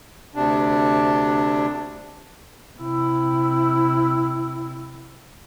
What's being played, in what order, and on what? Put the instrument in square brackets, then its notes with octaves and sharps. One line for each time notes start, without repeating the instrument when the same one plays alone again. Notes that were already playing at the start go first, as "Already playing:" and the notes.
[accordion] D2 C3 D4
[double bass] C3 E4